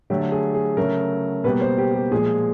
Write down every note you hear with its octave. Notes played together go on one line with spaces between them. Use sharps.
D3 F#3 A3 G4
G#4
G#4
C#3 F#3 A3 A#4
B2 G3 A#3 B4
C5
G4
G4
A#2 F3 G#3 G#4